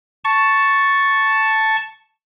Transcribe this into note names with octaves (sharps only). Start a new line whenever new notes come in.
A5 C#6